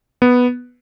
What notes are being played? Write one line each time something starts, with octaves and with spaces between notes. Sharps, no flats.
B3